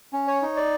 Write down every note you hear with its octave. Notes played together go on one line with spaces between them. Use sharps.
C#4
C#5
D#4
D5